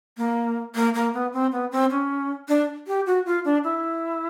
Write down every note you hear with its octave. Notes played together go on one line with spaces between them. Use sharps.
A#3
A#3
A#3
B3
C4
B3
C4
C#4
D4
G4
F#4
F4
D4
E4